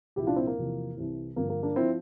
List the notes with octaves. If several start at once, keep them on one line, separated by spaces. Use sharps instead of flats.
C2 A#2 F3 E4 G4
D4 F4
C4 E4
A#3
E2 C3 F3
C2 C3 E3
G2 D3 F3 A#3
A#3
A#3 D4
F3 C4 E4